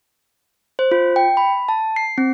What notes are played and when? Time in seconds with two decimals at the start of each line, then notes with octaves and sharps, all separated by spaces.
0.79 C5
0.91 F4
1.16 G5
1.37 B5
1.69 A5
1.96 C7
2.18 C4